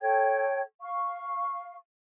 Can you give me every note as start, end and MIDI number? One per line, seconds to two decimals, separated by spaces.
0.01 0.61 69
0.01 0.61 73
0.01 0.61 79
0.01 0.61 92
0.80 1.74 77
0.80 1.74 85